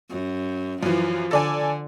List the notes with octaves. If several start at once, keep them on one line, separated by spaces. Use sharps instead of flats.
F#2
F#2 E3 F3
D3 A4 D5 G#5